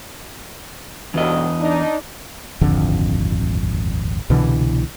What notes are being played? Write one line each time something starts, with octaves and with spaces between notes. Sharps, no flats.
B1 E2 G2 B2 D#5
D4 D#4
D#1 G#1 F2 D3
C2 B2 D3 E3